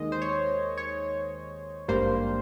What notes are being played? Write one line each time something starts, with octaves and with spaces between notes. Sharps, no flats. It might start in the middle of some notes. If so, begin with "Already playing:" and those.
Already playing: D#2 D#3 G#3 D#5
C5
C#5
C#5
G#1 G2 G3 A#3 C5